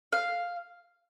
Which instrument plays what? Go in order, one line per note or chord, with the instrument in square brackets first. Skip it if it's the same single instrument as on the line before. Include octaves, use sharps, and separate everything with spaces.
[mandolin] F5